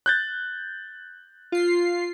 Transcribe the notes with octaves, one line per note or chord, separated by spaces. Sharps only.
F#6 G6 A6
F4 C7